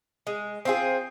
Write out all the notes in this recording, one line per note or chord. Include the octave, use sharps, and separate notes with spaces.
G#3
C4 F4 G#4